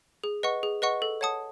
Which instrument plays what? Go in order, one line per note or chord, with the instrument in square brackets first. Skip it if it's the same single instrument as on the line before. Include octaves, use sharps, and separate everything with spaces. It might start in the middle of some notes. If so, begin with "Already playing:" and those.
[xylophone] G#4
B4 D#5 F#5 C#6
G#4
B4 D#5 F#5 C#6
A4
C#5 F#5 A5 D#6